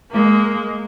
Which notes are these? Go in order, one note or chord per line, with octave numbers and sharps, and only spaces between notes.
G#3 A#3